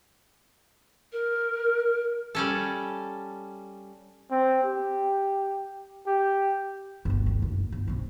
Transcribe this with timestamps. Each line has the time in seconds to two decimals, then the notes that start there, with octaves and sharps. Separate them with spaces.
1.12 A#4
2.35 G3 C#4 A4
4.31 C4
4.63 G4
6.07 G4
7.05 G1 F#3
7.26 D2
7.42 F#1
7.72 G1
7.88 C3 F#3